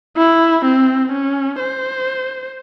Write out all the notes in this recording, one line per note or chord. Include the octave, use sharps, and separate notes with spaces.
E4
C4
C#4
C5